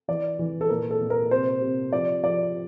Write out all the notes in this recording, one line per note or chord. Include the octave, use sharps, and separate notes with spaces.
E3 D5
E3
A4
A#2 A#4
A4
A#2
A#4
C3 C5
C3
F3 D5
F3 D5